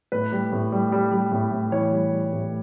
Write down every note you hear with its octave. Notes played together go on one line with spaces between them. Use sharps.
A2 B4
G3
A2
G3
G3
G3
A2
A2
E3 C#5
G3
G3
A2